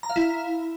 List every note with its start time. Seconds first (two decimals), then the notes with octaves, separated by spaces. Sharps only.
0.03 A#5
0.10 F5
0.16 E4